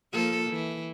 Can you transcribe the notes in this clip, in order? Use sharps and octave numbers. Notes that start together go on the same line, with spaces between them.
F3 A#3 A4
E3